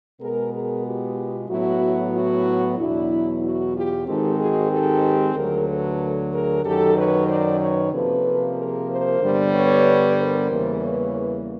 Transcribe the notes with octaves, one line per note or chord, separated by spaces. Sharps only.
B2 G#3 B3 G#4 A#4
G#4 A#4
F4 G4
A2 F#3 B3 E4 F#4
E4 F#4
E2 B2 F#3 D4 E4
E4 F#4
F4 G4
G#2 D#3 G#3 C4 G4 A4
F#4 G#4
G4 A4
D2 D3 F#3 A3 G#4 A#4
A4 B4
G#4 A#4
F#2 D#3 F#3 G4 A4
B4 C#5
C5 D5
B4 C#5
C3 F3 A#3 A4 B4
G#4 A#4
A#4 C5
G2 D3 G3 B3
B4 C#5
A#4 C5
E2 C#3 E3 G3 A#3
B4 C#5